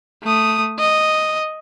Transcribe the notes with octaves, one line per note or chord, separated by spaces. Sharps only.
A3 D#6
D#5